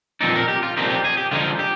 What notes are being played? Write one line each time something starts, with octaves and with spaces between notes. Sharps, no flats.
A#2 F3 C4 D#4 D5
A#4
G4
F4
A#2 F3 C4 D#4 G4
G4
G#4
G4
D3 F3 G#3 D#4 F4
G4